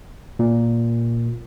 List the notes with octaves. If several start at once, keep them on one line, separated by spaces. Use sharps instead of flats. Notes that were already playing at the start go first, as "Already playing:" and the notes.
A#2